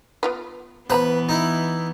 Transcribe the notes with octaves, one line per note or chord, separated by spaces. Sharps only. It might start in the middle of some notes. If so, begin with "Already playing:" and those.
B3 F4 B4
E3 B3 B4 C5 A#5 B5
D#4 E4